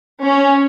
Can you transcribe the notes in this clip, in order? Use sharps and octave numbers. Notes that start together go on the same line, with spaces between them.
C#4